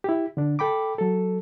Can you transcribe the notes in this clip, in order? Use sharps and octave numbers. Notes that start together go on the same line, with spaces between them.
E4 G4
D3 D4
A4 G5 B5 D6
F#3 A4